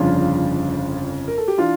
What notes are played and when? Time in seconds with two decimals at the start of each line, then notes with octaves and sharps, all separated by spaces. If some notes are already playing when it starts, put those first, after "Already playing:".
Already playing: G1 F2 C#3 F3 D4 F4
1.28 A#4
1.38 A4
1.48 G4
1.58 E3 D4 F4